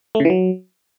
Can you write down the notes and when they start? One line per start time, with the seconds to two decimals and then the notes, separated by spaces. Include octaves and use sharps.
0.15 A3
0.20 C#3
0.25 E3
0.30 F#3